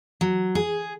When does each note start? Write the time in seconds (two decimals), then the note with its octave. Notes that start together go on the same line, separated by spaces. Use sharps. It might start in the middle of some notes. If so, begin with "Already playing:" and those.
0.21 F#3
0.55 G#4